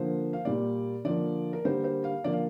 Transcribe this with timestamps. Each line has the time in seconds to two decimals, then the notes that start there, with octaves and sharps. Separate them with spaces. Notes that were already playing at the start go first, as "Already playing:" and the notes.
Already playing: D3 F3 A#3 C5
0.33 F5
0.45 A#2 G3 A#3 D5
1.05 D3 F3 A#3 D5
1.53 A#4
1.65 D3 G3 A#3 C5
1.84 C5
2.04 F5
2.24 D3 F3 A#3 D5
2.33 F5